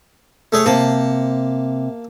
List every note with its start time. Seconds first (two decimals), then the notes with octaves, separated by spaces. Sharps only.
0.52 A3 G#4 C#5
0.66 C3 A#3 A5